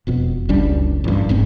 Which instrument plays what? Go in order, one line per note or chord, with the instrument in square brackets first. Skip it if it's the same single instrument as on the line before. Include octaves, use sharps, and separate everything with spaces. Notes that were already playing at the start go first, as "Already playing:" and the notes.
[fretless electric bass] E1 F2 B2
F#1 C#2 G3 D4
A1 G2
F1 G#2 C4